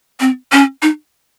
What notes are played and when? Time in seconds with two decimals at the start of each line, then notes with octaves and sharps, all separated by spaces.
0.21 C4
0.52 C#4
0.82 D#4